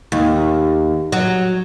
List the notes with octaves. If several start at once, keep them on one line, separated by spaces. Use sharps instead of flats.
D#2
F#3